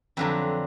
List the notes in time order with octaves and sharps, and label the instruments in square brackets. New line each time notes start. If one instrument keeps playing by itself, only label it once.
[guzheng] F2 D3 F#3 B4